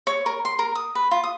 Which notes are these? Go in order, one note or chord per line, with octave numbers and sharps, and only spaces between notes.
C#5
A#4
C6
A#4
D#6
B4
F4
D#6